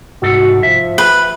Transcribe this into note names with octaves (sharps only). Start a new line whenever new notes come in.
C2 G#2 F#4 A4
F3 E5
B4